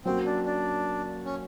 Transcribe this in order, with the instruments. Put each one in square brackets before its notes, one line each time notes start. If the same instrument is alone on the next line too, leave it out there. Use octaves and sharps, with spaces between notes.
[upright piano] F#3 A#3 C#4 F#4 [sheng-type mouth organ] C4
[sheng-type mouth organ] D4
D4
C#4